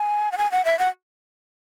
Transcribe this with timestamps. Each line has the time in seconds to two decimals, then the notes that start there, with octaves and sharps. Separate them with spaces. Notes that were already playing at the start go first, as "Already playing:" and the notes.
Already playing: G#5
0.32 F#5
0.38 G#5
0.52 F#5
0.65 E5
0.79 F#5